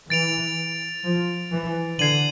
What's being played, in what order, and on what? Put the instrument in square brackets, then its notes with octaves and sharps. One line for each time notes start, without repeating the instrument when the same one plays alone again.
[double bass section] E3 [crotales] A6 D7 F7
[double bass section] F3
E3
[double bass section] D3 [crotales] G#6 C7 D#7 F#7